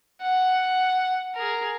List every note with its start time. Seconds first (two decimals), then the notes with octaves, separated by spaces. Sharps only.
0.21 F#5
1.35 G#4 A#4